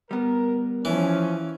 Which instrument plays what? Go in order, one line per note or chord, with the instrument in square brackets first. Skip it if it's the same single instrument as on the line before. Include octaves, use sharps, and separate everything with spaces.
[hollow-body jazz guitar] G3 B3 [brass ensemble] A#4
[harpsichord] E3 [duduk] F3 [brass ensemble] C#4